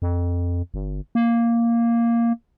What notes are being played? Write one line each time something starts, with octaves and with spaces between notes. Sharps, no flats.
F2
G1
A#3